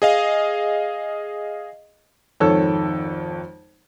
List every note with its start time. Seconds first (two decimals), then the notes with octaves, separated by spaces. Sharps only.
0.02 G#4 D#5 F5
2.40 G#1 F2 D#3 A4 C#5 E6